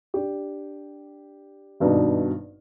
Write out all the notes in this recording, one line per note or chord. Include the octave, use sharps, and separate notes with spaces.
D4 G4
G#1 G2 B2 D4 D#4